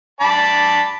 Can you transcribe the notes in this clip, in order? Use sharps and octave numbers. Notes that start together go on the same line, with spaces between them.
D5 A5 B5